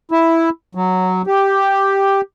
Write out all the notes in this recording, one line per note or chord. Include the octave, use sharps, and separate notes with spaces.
E4
F#3
G4